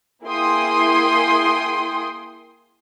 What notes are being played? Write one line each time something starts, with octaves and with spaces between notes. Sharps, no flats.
A#3 E4 G#4 G5 C6 D#6